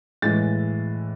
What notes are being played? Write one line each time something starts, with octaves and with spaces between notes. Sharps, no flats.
A2 E3 G#3 A6